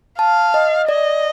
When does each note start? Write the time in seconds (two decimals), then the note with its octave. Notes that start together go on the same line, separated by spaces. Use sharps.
0.19 F5 A5
0.54 D#5
0.88 D5 D#5